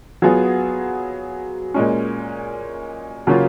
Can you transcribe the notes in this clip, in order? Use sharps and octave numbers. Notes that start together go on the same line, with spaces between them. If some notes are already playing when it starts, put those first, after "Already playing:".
F#3 B3 F4 G#4
A#2 G#3 C#4
C#3 F#3 A#3 C#4 F4